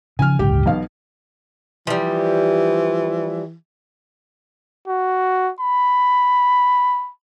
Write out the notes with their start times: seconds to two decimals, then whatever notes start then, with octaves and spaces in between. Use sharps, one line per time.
0.19 C#3 E3 F3 G#5 F6
0.39 D1 G1 C#2 G4 G5
0.66 B1 B3 F5
1.87 E3 F3 G3
4.88 F#4
5.61 B5